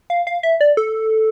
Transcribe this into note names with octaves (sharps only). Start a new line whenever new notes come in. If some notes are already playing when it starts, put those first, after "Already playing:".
F5
F5
E5
D5
A4